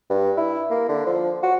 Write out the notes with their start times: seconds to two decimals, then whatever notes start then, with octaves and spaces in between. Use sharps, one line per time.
0.10 G2
0.37 E4
0.71 A#3
0.89 D3
1.06 F3
1.43 F#4